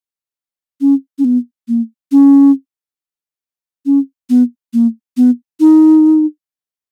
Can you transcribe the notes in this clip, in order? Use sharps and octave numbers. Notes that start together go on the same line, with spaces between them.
C#4
C#4
B3
A#3
C#4
C#4
B3
A#3
B3
D#4